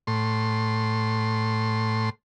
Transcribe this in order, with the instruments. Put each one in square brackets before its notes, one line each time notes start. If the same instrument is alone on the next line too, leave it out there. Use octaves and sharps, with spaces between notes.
[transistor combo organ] A2 C6